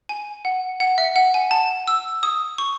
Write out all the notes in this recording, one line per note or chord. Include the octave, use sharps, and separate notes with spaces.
G#5
F#5
F#5
E5
F#5
G#5
A5
E6
D#6
C#6